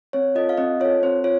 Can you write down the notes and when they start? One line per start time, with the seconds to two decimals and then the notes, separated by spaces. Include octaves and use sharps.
0.13 C4 C#5
0.35 F4 A4 D#5
0.49 F5
0.58 C4 D#5
0.80 F4 A4 C#5
1.03 C4 C5
1.24 F4 C#5